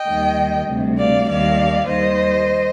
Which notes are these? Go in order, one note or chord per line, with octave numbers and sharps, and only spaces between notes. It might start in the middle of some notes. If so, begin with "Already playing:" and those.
Already playing: D#5 G5
D#2 D#3 G3
D2 C3 G3
D5 F5
D#2 D#3 G3 D5 F5
D#2 D#3 G3 C5 D#5